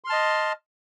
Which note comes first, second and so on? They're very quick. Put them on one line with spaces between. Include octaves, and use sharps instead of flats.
C6 F6 A5 D#5